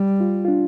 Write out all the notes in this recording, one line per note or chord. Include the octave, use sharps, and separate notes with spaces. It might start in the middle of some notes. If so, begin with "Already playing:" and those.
Already playing: G3
F4
F4
D4